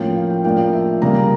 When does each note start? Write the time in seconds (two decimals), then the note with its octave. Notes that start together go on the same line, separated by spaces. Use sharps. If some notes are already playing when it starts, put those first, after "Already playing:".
Already playing: A2 F3 A#3 C#4 G5
0.16 F5
0.30 G5
0.45 A2 F3 A#3 D4 G5
0.73 E5
1.02 C#3 G3 A#3 D4 A#5